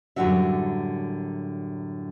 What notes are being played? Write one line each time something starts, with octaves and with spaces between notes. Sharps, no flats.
F#2 A2 D3 G3 F#4 E5